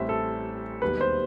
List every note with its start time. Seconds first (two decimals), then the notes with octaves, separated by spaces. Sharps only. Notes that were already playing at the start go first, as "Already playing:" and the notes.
Already playing: A1 A2 G3 C4 E5
0.09 A4
0.82 E1 D#2 D#3 G3 B3 B4
1.01 C5